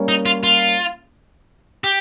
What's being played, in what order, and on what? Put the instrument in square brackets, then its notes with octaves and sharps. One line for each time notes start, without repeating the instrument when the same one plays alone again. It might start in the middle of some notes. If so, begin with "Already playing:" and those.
Already playing: [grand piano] G3 A#3 C#4
[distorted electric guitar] D#4
F4
F4
G4